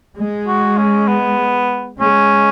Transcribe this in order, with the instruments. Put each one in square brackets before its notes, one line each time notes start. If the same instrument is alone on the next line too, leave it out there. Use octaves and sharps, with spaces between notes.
[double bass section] G#3
[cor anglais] F#4
C#4
B3
[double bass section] G#3 [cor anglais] C#4